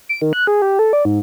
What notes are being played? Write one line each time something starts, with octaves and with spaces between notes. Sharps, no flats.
D7
D#3
F#6
G#4
G4
A4
D5
G#2